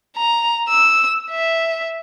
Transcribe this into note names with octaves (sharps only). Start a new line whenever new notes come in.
A#5
E6
E5